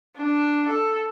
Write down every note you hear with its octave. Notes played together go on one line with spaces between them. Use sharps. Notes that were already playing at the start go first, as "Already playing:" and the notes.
D4
A4